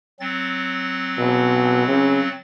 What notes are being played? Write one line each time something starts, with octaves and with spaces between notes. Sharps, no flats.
F#3 C4 A6
B2
C#3